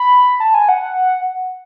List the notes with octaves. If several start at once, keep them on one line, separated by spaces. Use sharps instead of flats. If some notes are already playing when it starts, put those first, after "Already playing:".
Already playing: B5
A5
G#5
F#5